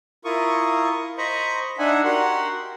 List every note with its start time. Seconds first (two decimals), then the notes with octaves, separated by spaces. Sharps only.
0.25 E4 F4 A#4 C#6 D#6
1.18 C5 D#5 A#5 B5 C#6
1.78 D4 D#4 E5 F#5 G#5
2.04 F#4 G4 A#4 F#5 C6